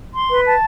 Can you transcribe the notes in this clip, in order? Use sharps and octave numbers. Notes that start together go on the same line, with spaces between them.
C6
B4
A5